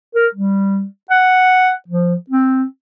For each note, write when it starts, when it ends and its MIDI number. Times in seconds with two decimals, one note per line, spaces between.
0.15 0.27 70
0.34 0.85 55
1.11 1.71 78
1.88 2.15 53
2.30 2.65 60